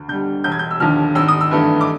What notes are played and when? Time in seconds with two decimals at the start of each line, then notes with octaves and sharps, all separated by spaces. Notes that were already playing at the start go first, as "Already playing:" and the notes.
Already playing: D2
0.08 D3 G3 G6
0.44 E1 G6
0.52 G#6
0.59 G6
0.71 E6
0.80 D#2 D3 F3 F6
1.15 G#1 E6
1.28 D#6
1.41 E6
1.51 G2 E3 A3
1.81 D6